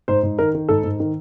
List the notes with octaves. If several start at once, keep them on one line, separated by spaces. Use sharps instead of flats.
G#2 C5
G#2
D#3 A#4
D#3
G#2 A4
G#2
D#3